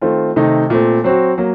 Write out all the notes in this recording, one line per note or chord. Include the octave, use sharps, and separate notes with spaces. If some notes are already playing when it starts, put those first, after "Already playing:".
D#3 A3 C4 F4
C3 D#3 A3 D#4
A#2 A3 C4
F#3 C4 F#4
F#3 A#3